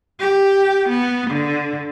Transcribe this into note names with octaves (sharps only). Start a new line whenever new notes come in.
G4
B3
D3